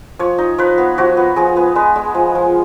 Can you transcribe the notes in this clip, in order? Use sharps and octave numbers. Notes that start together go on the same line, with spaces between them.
F3 C#5
D#4
F3 B4
B3
F3 F#4
B3
F3 G#4
B3
G#3 B4
G#3
F3
F3